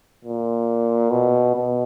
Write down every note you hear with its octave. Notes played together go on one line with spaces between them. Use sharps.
A#2
B2
B2